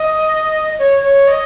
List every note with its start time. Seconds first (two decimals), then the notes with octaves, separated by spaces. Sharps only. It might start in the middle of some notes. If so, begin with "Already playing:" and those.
Already playing: D#5
0.79 C#5
1.03 C#5
1.27 D#5